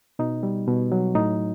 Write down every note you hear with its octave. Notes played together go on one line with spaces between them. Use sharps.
B2 D#4
G3
B2
F#3
A2 D#4